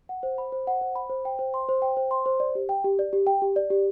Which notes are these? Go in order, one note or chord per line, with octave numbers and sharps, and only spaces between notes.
F#5
C5
B5
C5
F#5
C5
B5
C5
G5
C5
C6
C5
G5
C5
C6
C5
D5
G4
G5
G4
D5
G4
G5
G4
D5
G4